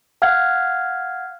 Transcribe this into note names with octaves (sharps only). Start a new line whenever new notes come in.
F5 F#5 F6 G#6